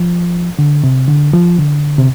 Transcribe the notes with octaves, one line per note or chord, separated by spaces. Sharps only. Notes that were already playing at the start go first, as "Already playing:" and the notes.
Already playing: F3
D3
C3
D3
F3
D3
C3